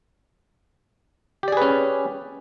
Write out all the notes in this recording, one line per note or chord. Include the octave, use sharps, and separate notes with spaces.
C#4 G4 G#4 B4 D5